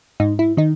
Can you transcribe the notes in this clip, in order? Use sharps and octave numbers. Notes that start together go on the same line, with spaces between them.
G#2 D#4
E4
D#3 D#4